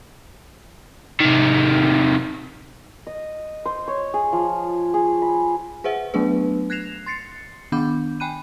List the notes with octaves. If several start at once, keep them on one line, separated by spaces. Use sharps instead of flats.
C3 D#3
D#5
C5
C#5
G#4
F3
G#4
B5
G#4 B4 C5 E5 F#5
F#3 A3 B3 D4 G#4 B4
F#6 G#6 A#6 C7 E7 F7
C6 A6 C7 C#7
D#3 B3 D4 B5 D6 G6
G5 G#5 B5 F#6 D#7